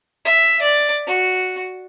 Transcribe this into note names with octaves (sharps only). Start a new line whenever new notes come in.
E5
D5
F#4